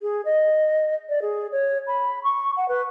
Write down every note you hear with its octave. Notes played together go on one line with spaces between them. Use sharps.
G#4
D#5
D5
G#4
C#5
B5
C#6
F#5
B4